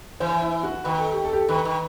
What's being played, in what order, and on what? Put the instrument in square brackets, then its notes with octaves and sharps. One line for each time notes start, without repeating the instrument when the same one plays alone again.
[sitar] E3 [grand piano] C5
[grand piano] E4
F#4
[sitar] D#3 [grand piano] B4
[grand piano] A4
G4
A4
G4
A4
[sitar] D#3 [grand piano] B4
[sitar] D#3